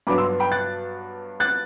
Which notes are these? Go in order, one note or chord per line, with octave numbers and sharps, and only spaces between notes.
G2 F#3 B3 D4 B5 D6
C6 E6
G5 B5
F#6 A6
F#6 A6